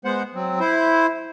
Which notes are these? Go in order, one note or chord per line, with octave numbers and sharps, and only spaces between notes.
G#3 B3 C5 F#5
F#3 C4
E4 C5